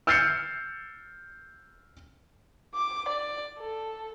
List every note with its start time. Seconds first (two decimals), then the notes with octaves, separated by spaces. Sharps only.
0.07 E6 F6 G6 A6 C7 C#7
2.75 D6
3.08 D5
3.59 A4